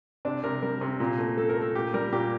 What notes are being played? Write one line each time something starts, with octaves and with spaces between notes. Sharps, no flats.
C3 D4
C3 A#4
G3 A#4
C3
A#2
A3
A3 A4
A#4
A3
A4
A#2 G4
G3 A#4
A#2 G4